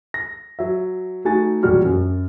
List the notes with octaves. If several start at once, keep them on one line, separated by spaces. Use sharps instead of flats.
A#6
F#3 E5
A3 D#4 F#4 G#5 A6
E1 A#1 F#3 G3 F#4 F6
F#2